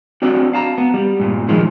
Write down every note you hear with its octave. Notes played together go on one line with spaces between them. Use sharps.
C4 D4 F#4 D5
F5 A5 A#5
B3
G3
G2 A#2
D#3 F3 G#3